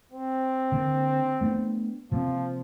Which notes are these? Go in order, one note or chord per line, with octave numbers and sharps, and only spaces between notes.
C4
D3 A#3
A3 B3 D4
C3 F3 A#3 C4